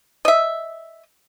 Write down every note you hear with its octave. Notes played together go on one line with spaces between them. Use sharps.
D#5 E5